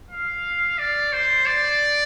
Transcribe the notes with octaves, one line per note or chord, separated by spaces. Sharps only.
F5
D5
C5
D5